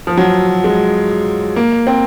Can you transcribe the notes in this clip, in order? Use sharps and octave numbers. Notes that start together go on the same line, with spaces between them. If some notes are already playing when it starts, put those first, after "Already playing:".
F3
F#3
G#3
A#3
C4